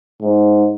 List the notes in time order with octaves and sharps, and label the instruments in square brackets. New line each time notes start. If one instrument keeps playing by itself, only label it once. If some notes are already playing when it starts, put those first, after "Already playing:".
[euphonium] G#2